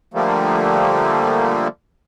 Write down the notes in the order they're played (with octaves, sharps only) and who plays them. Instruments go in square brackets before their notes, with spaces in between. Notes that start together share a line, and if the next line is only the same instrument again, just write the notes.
[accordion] D3 F3 G3 A3 A#3